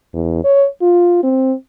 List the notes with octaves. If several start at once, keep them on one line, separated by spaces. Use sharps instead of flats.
E2
C#5
F4
C4